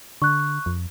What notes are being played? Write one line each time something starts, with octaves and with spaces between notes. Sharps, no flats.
D3 C#6 F#6
F2